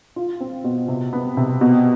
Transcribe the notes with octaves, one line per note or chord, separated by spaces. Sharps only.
F4
C4
B2
C3
B3
C3
B2